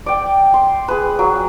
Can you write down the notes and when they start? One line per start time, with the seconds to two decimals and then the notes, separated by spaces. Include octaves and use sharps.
0.06 D5 G5
0.54 C6
0.88 G#4 B4
1.19 F#3